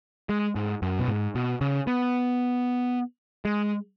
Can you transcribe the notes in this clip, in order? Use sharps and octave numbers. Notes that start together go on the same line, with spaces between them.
G#3
G#2
F#2
B2
G#2
B2
C#3
B3
G#3